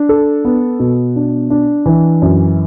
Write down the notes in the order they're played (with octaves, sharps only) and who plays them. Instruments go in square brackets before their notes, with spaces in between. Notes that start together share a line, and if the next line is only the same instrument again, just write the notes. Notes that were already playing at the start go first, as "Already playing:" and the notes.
Already playing: [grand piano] D4
A4
B3
B2
D4
D4
E3
F#2